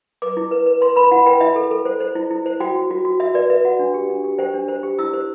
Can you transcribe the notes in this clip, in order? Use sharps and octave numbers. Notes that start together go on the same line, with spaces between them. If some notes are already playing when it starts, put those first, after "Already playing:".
B4 D6
E4
B4
B4
B4 C6
B4 B5
E4 F#5
B4 G5
E4 E5
A4
A4
C5
C5
E4
E4
C5
F#4 G5
F#4
F#4
F#4
F#4 E5
B4 D5
B4 E5
F#4 F#5
D4
G4
D4
G4
C5 G5
D4
C5
G4
E4 E6
C5